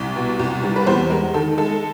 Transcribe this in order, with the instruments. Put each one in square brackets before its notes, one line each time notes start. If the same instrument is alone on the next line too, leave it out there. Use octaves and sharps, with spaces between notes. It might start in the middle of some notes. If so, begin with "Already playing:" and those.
Already playing: [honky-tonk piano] C2
B2
C2
G3
B4
E2 C5
G#3 A#4
D#3 A4
G#3 A4